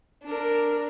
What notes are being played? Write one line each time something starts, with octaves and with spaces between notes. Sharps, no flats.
D4 A#4